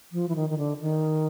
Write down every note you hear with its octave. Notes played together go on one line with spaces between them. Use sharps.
F3
E3
D#3
D#3
D3
D#3